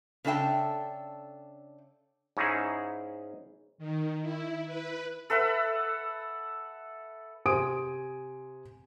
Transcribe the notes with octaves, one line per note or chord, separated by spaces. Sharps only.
C#3 D4 A4 E5 G5 A5
G#2 C#4 D#4 E4 G#4
D#3
E4
B4
A4 B4 E5 F#5
C3 C5 G#5 D#6 D7